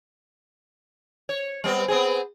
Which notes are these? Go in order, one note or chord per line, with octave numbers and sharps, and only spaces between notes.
C#5
G3 B3 C4
B3 C4 G#4